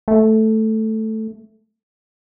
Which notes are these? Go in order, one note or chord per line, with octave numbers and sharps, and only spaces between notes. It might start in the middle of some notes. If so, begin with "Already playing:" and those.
A3